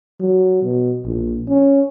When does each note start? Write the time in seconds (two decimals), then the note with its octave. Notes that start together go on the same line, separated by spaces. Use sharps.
0.20 F#3
0.63 B2
1.05 A#1
1.49 C#4